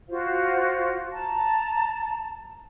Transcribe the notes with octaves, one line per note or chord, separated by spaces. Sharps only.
F4 F#4 C5 F5
A5 A#5